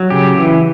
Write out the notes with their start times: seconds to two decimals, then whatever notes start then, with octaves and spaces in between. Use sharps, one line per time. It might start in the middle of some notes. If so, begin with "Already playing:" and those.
Already playing: F#3
0.10 C#3 G4
0.36 E3